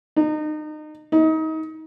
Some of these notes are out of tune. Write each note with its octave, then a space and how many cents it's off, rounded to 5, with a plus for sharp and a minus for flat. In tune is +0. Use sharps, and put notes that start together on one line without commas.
D#4 -30
D#4 +30